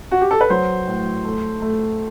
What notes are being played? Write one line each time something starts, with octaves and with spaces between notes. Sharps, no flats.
F#4
G4
A4
B4
F#3 C5
A2
A3
A3